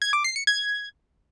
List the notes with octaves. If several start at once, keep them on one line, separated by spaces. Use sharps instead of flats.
G#6
D6
C7
C#7
G#6